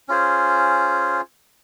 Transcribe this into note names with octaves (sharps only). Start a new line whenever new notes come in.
C#4 F4 G#4 C5